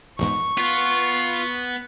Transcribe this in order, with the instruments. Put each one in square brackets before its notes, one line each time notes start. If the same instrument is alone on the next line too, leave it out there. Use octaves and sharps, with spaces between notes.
[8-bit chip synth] A#1 E2 G#2 [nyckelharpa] C#6
[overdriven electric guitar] B3 [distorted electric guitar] F4